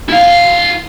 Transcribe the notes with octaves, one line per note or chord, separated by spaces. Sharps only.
E4 F5